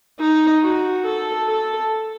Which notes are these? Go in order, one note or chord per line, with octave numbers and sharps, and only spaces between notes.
D#4
F#4
A4
A4